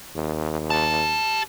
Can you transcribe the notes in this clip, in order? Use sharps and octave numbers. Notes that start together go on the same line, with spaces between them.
D#2
G4 A5